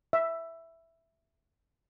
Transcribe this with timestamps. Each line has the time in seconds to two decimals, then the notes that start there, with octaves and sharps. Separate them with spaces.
0.13 E5